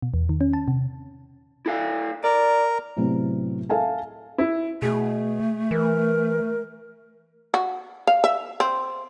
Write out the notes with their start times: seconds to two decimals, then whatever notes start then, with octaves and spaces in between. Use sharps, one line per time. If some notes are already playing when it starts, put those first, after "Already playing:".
0.02 B2
0.14 E2
0.29 D#3
0.41 C#4
0.53 A5
0.68 C3
1.66 E4 A4 F5
2.24 A#4 D5
2.96 A2 C3 F#3 A3 B3 C4
3.70 A4 E5 F5 G#5 A5
4.38 E4
4.82 B2 A3 G#4
5.71 E3 A#4
7.54 F#4
8.07 F5
8.24 E5
8.60 C4